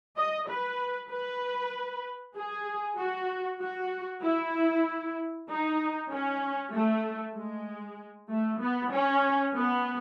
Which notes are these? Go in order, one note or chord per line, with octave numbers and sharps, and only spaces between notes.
D#5
B4
B4
G#4
F#4
F#4
E4
D#4
C#4
A3
G#3
A3
B3
C#4
B3